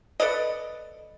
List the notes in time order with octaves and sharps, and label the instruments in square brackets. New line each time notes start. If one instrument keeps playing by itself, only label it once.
[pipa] A4 B4 D5 D#5